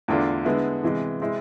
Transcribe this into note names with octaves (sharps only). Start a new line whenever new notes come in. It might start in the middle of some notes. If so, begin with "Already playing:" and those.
E2 D3 A3 D4 F4
D3 G#3 B3 E4
C3 E3 G#3
C3 G#3 C4 E4